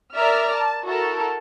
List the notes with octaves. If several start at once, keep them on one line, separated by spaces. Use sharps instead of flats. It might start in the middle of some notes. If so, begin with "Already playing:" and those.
A#4 D5 E5 F6
A5
E4 F#4 A4 A#4